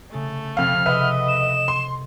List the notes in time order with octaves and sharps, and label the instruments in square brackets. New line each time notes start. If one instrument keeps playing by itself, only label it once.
[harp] C#3 A6 [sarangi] A3
[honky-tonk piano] F2 F5 [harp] C3 F3 [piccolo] F6
[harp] G#4 A4 C5 [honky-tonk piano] B4 E5 F#5 [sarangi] D#5
[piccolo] E7
[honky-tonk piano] C6